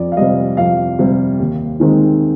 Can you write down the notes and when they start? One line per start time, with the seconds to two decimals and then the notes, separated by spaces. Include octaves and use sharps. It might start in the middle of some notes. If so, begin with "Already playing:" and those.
Already playing: F2 D5
0.12 F5
0.17 C3 G3 D#5
0.57 F2 F5
0.99 C3 G3
1.40 D#2
1.80 D#3 G#3 C4 D#4